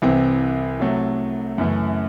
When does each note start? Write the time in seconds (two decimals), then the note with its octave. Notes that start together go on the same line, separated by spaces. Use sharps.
0.02 C2 C3 E3 C4
0.80 C3 F#3 A3
1.58 F#2 C#3 E3 A3